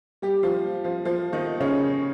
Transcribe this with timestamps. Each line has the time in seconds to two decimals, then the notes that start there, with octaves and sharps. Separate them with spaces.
0.22 G3 G4
0.43 F3 F4
0.84 F3 F4
1.05 F3 F4
1.33 D#3 D#4
1.60 C#3 C#4